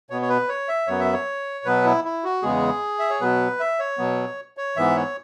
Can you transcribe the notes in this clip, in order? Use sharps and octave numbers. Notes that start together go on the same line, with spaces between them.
B2 B3 C#5
C#5
B4
C#5
E5
F#2 F#3 B3 C#5
E5
C#5
B2 F#3 B3 B4
E4
E4
F#4
E2 C#3 G#3 B3 G#4
E5
C#5
B2 F#3 B3 B4
E5
C#5
B2 F#3 B3
C#5
G#2 E3 B3 E5
C#5